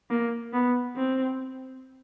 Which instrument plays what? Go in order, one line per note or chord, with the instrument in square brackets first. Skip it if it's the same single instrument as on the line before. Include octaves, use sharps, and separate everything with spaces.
[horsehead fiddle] A#3
B3
C4